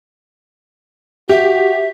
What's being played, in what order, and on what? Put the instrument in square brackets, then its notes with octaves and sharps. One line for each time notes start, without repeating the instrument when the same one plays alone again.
[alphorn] F#4 [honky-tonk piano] G4 [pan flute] E5